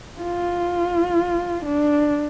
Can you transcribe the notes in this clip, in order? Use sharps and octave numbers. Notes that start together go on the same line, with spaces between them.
F4
D4